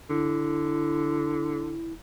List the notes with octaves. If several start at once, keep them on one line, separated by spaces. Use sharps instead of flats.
D3 E4